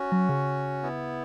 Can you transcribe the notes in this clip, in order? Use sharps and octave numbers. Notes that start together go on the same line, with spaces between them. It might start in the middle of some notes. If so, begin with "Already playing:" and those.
Already playing: C#4 F#4
F#3
C#3
B3 E4